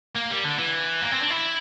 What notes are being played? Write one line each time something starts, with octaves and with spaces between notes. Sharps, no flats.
A#3
G3
D3
E3
A#3
C4
D4
E4